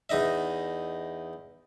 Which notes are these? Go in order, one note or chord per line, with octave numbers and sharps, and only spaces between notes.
E2 D#4 D#5 E5